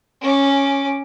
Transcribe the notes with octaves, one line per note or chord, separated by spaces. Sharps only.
C#4 D6